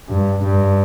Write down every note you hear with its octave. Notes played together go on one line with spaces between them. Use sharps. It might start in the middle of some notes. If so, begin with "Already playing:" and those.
G2
G2